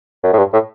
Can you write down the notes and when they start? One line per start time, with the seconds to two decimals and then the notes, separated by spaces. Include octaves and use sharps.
0.23 F#2
0.33 A2
0.38 G2
0.53 A2